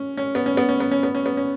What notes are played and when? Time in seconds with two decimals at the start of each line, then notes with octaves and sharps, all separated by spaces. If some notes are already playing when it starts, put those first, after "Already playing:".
Already playing: C#4
0.17 C#4
0.35 B3
0.46 C#4
0.57 B3
0.69 C#4
0.80 B3
0.91 C#4
1.03 B3
1.15 C#4
1.26 B3
1.37 C#4